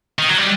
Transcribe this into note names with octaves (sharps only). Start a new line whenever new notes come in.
D#3
F#3
G3